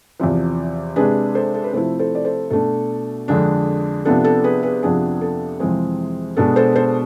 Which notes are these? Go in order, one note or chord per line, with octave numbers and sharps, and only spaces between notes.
E2 C3 F3
C3 G#3 D4 G#4 B4
A4 C5
A4
B4
C3 F3 A3 E4 A4 C5
A4 C5
D5
A4 C5
B2 A3 D4 A4
F2 D3 G#3 D4
C3 F3 B3 D4 A4
A4
G#4 B4
G#4 B4
F2 C3 F3 B3 D4 G#4
A4
F2 C3 E3 G#3 C4 G#4
B2 G#3 B3 D4 A4
A4 C5
A4 C5